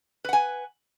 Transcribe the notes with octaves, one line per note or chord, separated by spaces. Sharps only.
B4 F#5 G#5